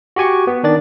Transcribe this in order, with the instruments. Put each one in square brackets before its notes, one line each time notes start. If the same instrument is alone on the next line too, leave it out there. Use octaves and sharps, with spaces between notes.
[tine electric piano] F#4 G4 G#5 C#6
B3
D#3 D4 D5 A6